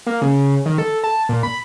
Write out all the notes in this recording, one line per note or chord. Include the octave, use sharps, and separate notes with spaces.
A#3
C#3
D#3
A4
A5
A#2
B5